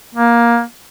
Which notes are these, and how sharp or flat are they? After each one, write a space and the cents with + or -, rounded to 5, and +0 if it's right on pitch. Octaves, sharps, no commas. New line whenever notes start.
A#3 +15